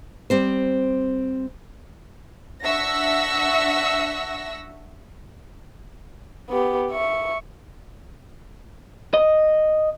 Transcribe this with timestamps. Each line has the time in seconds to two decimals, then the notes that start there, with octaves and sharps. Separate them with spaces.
0.30 G3 C4 C5
2.63 D4 E5 F#5 C#6 E6 A#6
6.50 B3 G4
6.91 E5 C#6
9.14 D#5